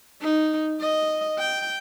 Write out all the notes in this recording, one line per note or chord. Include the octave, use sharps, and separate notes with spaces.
D#4
D#5
G5